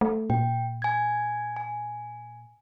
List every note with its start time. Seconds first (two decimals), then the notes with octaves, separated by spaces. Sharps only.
0.01 A3
0.30 A#2 G5
0.82 G#5 G#6
1.56 G#5